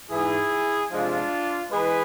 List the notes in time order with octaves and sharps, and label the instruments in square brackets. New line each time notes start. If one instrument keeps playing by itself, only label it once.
[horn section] G#2 E3 G#3 E4 G#4
C3 F3 G#3 D4 F4
E3 G#3 G#4 B4